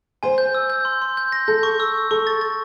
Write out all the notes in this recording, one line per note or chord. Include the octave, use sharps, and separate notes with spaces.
C5 G#5
G6
E6
G6
C6
C6
G6
A#6
A4 G6
C#6
E6
C#6
A4 C#6
A6
A6